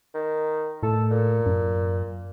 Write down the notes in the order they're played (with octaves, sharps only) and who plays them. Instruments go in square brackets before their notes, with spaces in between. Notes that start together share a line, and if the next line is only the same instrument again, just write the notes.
[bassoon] D#3
[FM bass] A2 [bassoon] A4
[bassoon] A#2
[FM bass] F#2